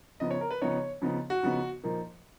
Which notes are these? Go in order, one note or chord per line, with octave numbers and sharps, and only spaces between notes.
C#3 F3 B3 D#4 D#5
C#5
A#4
B4
C#3 F3 B3 D#4 C#5
C#3 F3 B3 D#4
F#4
C#3 F3 B3 D#4
A#2 F3 A#3 D#4